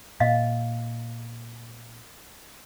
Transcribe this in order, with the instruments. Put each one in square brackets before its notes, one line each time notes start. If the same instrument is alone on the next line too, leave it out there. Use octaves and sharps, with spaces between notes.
[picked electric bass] A#2 [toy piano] D#5 F5